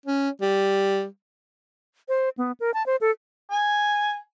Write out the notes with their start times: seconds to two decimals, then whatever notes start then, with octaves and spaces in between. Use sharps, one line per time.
0.06 C#4
0.41 G3
2.09 C5
2.37 B3
2.60 A#4
2.74 A5
2.86 C5
3.01 A4
3.50 G#5